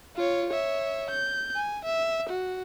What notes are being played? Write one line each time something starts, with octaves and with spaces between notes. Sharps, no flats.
F4 C#5
C#5 E5
G6
G#5
E5
F#4